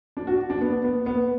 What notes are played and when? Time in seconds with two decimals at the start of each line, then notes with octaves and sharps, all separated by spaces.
0.17 D4
0.27 F#4
0.50 D4
0.61 B3
0.84 B3
1.06 B3